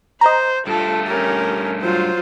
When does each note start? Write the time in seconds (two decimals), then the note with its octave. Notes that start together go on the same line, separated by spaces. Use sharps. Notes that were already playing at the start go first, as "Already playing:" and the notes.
0.21 C5 D#5 A#5
0.67 G2 A3 F4 A4
1.08 C#4 G4 A#4
1.82 F#3 F4 C5